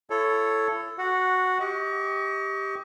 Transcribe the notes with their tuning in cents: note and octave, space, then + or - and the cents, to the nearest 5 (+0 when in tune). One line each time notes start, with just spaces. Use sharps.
E4 +40 A4 +0 C#5 +0
F#4 +0 F#5 -15
G4 +0 D#5 +30 C#6 +25